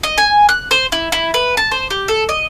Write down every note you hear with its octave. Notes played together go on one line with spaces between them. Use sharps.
D#5
G#5
F#6
C5
E4
E4
B4
A5
C5
G4
A4
D#5